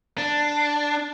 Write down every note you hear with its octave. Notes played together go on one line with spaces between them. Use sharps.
D4